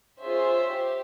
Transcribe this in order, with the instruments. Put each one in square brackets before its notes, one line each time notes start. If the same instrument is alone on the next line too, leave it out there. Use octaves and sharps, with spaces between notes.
[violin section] C#4 F4 G#4 C5 E5
G4